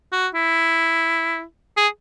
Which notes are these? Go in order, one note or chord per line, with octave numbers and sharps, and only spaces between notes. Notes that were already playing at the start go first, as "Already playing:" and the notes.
F#4
E4
G#4